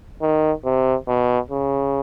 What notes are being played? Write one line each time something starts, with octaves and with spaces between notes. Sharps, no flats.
D#3
C3
B2
C#3